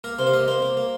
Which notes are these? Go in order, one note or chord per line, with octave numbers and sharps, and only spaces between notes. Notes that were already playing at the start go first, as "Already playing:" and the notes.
A#3 A#4
C3 C5
F5
A#3 D#5
A#3 C5
A#3
A#3